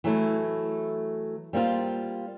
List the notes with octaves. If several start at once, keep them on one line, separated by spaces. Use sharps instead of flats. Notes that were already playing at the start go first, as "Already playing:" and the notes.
E3 F#3 A3 E4
G3 A#3 C4 F4